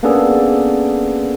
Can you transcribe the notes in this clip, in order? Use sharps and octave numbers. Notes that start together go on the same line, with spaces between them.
A#3 B3 C#4 D4 G#4 A4